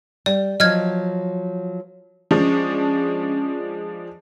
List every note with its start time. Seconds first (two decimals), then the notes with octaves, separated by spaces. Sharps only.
0.26 G3 D5
0.60 F3 F#3 D#5 F6 G#6
2.31 F3 G#3 C#4 D4